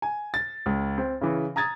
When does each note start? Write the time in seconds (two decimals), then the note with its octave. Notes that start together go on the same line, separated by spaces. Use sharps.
0.02 G#5
0.34 A6
0.66 C#2
0.98 C4
1.21 C#3 E3
1.56 A#5 D#6 G#6 A6